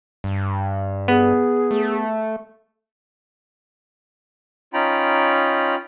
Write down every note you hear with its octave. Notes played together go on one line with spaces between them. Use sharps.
G2
B3 G#4
A3
C#4 D#4 F4 G5 A#5 B5